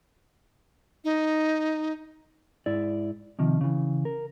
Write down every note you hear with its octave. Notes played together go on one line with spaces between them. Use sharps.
D#4
G#2 E4 D5
C3 D#3 F3
C#3 E3
A#4